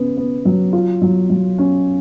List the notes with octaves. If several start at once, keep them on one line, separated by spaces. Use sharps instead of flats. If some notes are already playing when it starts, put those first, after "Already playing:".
Already playing: C#3 B3
B3
F#3
F4
F#3
F#3
C#4